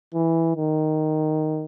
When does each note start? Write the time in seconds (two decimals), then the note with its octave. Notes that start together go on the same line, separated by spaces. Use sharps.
0.14 E3
0.56 D#3